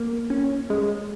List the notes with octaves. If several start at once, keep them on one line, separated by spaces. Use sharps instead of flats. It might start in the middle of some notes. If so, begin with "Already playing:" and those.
Already playing: A#3
C#4
G#3